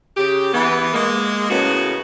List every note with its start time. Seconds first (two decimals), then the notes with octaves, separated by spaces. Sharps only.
0.17 C#3 G4
0.54 E3 B3
0.94 G#3 A#3
1.50 A2 C#3 A#3 B3 C#4 F#4